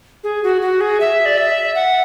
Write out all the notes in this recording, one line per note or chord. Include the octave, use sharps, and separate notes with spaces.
G#4
F#4
F#4
G#4
E5
D5
E5
F#5